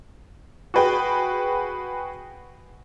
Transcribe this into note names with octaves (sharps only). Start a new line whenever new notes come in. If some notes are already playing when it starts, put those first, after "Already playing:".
F#4 G#4 B4 G5